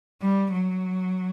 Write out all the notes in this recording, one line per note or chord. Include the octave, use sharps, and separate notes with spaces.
G3
F#3